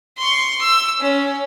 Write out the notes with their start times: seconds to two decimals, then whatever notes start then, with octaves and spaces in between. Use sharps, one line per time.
0.17 C6 C#6
0.61 E6
1.00 C#4